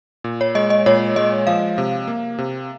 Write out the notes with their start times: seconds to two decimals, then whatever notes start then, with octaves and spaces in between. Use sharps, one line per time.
0.24 A#2
0.41 C#5
0.55 G#3 D#5
0.70 D#5
0.86 A#2 C#5
1.16 G#3 D#5
1.47 F3 F5
1.78 C3
2.08 A#3
2.38 C3